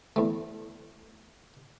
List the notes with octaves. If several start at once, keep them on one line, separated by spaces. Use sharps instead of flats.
E2 A3